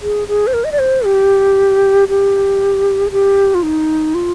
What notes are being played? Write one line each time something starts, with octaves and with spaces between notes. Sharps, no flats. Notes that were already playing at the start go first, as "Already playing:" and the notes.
G#4
G#4
C5
A#4
D#5
D5
C5
G4
G4
G#4
G4
F4
D#4
F4